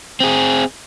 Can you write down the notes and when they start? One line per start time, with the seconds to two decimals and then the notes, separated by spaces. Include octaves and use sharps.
0.20 C4 G#4